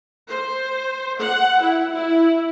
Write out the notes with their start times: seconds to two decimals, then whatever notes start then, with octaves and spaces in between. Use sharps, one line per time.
0.27 C5
1.19 F#5
1.61 E4
1.92 E4